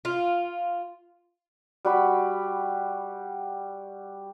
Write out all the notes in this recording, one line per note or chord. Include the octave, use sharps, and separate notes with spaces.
F4
G3 F#4 B5